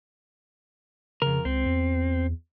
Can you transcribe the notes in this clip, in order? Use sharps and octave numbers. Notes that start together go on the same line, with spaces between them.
F2 C#3 A#4
C#2 C4
E2